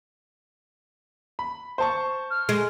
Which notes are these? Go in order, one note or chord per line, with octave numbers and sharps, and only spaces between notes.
B5
C5 A5 C#6
F6
G#3